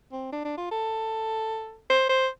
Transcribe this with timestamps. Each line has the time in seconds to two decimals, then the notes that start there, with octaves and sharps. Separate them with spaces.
0.12 C4
0.32 D4
0.45 D4
0.58 F4
0.71 A4
1.90 C5
2.10 C5